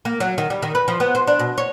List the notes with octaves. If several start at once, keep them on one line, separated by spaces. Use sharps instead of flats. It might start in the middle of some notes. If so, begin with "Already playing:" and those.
A#3
F#3
D#3
G3
D#3
B4
F3
B3
C5
D4
B2
C#5